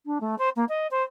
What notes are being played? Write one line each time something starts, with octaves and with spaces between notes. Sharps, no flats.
D4
A3
C5
A#3
D#5
C5